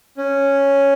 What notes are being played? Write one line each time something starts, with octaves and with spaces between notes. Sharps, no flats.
C#4